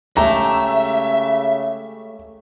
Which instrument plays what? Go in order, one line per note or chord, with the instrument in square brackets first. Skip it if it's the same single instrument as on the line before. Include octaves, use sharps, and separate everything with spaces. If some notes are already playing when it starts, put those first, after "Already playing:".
[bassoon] C#3 [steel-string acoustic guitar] G#3 A3 G4 [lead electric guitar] E5 [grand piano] A#5